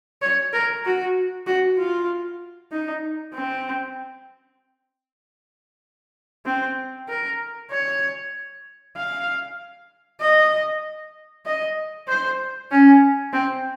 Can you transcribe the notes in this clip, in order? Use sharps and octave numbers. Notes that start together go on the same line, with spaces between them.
C#5
A#4
F#4
F#4
F4
D#4
C4
C4
A#4
C#5
F5
D#5
D#5
C5
C#4
C4